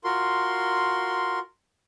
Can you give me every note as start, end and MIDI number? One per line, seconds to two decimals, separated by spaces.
0.04 1.39 65
0.04 1.39 66
0.04 1.39 70
0.04 1.39 84